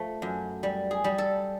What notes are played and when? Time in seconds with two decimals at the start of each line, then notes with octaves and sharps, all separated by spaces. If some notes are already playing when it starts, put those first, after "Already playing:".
Already playing: F3 A3
0.22 F#2
0.63 G3
0.91 G#4
1.04 G3
1.18 A4